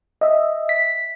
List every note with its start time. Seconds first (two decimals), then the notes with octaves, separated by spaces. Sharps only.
0.21 D#5 E5
0.69 B6